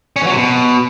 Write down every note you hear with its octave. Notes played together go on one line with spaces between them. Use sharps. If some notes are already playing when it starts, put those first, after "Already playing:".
C#4
E3
F#3
C3
B2